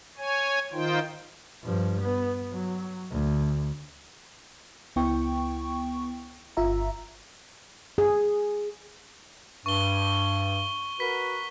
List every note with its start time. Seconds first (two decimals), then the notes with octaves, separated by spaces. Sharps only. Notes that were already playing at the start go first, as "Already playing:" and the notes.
0.18 C#5 G#5
0.73 D#3 D#4 F4 C5 G5
1.64 G2 F3
2.01 B3
2.53 F#3
3.11 D2
4.96 C#2 B3 E4 G5 C#6
6.57 G1 F4 E5 A#5
7.98 G#4
9.66 G2 C#6 G7
11.00 F#4 A#4 B4 B6